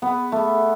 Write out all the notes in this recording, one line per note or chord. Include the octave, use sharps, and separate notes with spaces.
B3
A3